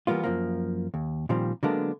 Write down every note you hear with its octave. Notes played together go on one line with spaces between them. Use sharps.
E3 G3 A#3 B3 F4
F#2 F3 A#3
D#2
A#2 D#3 F3 G3 C4
D3 F#3 G#3 A#3 B3 D4